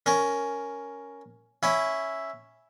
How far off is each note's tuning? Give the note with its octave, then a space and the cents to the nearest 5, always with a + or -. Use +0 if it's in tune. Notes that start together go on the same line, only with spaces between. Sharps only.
C#4 +5 A#4 +0
C#4 +0 E4 +0